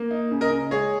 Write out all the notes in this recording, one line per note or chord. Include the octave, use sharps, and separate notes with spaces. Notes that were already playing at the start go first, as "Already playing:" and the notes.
Already playing: A#3
D#4
C#3
A#4 D#5
C#3
G#3 G#4 C#5